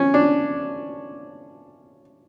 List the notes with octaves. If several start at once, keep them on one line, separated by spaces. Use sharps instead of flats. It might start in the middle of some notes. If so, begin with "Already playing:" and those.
Already playing: C#4
D4